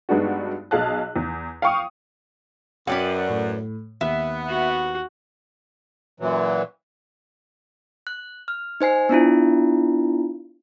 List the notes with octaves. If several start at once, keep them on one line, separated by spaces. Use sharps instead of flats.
G2 G#3 B3 D4 D#4 F#4
B1 G#4 F5 A5 F#6
E2
F5 G5 C#6 D#6
F#2 C#4 B4 D5 F#5 G5
A2
D#2 B3 E5
F#4
F#2 A#2 E3 F#3
F#6
F6
D#4 C5 G#5 C7
B3 D4 E4 F4